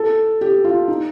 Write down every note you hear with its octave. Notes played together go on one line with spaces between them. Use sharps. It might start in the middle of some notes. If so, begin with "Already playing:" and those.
Already playing: A4
G4
F4
D#4